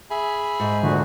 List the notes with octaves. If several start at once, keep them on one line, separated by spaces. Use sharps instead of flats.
G#4 E5 B5
G#2
D2 A#2 D3 F#4